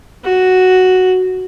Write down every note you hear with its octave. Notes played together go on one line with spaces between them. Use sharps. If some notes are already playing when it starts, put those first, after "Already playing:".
F#4